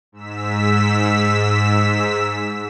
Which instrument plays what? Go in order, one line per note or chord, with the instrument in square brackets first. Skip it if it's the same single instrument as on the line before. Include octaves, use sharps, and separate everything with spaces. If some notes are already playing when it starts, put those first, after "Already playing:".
[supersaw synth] G#2 E6 B6